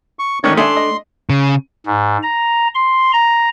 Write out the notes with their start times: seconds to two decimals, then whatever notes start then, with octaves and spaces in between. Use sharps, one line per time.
0.19 C#6
0.44 A1 D#3 D4 C#5 C#6
0.57 A3 D4 E5 G#5 C6 D#6
0.76 D#5
1.30 C#3
1.86 G#2
2.23 A#5
2.75 C6
3.13 A#5